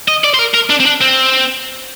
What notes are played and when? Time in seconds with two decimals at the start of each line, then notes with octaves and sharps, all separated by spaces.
0.08 D#5
0.24 D5
0.34 C5
0.39 A#4
0.54 A#4
0.70 D4
0.80 C4
0.86 D4
1.01 C4